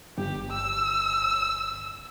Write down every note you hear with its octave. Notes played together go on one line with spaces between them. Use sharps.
G1 G4
E6